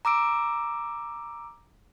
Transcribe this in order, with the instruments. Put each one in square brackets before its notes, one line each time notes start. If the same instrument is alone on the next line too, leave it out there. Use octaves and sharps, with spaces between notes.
[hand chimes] A#5 D6 E6 D7